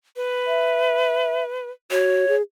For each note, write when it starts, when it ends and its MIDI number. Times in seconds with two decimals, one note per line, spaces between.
0.16 1.70 71
0.47 1.44 76
1.91 2.25 66
1.91 2.35 73
2.28 2.42 68